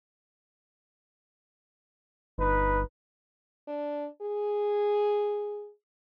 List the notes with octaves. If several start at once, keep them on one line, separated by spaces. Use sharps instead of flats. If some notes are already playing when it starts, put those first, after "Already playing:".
G1 D#4 B4
D4
G#4